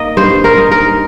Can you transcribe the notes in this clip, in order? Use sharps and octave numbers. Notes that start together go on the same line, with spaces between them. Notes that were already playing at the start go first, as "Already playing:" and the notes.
Already playing: A#3 D#4 D#5
G2 C5
A#4
D#4
A#4